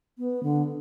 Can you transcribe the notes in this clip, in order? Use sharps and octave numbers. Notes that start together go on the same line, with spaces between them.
B3
D3